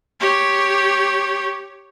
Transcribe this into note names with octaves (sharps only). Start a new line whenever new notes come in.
G4 C#5